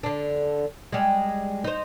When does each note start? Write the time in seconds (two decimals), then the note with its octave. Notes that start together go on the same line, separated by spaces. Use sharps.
0.03 D3 D4
0.92 G3 G#3
1.64 D#4 C5